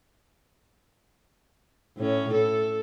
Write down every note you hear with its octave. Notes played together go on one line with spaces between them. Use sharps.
A2 C#4
A4